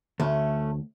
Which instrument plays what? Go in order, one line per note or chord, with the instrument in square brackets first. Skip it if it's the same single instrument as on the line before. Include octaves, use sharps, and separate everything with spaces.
[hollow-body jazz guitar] D2 [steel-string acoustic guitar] A3 C#4